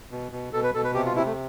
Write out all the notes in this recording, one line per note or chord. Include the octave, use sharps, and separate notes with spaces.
B2
B2
B2 A4
B4
B2 A4
B4
C3 G4
F4
C3 E4
A3